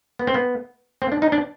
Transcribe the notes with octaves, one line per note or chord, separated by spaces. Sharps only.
B3
C4
B3
C4
D4
D#4
D4